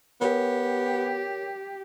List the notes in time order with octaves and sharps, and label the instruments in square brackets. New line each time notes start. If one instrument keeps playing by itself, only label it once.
[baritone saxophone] B3 [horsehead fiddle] G4 [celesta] A#4 C#5